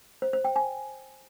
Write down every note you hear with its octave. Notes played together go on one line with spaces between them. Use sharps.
C5
C5
G5
G#5